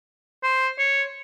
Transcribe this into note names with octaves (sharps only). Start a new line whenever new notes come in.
C5
C#5